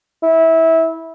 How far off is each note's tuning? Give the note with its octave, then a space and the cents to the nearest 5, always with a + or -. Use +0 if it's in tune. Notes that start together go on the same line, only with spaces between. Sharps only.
E4 -20